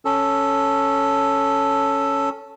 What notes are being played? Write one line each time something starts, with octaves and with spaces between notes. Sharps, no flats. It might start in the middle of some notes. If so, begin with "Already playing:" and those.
C#4 A4